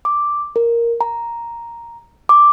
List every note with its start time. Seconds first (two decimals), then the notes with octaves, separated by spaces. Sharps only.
0.05 D6
0.56 A#4
1.01 A#5
2.29 D6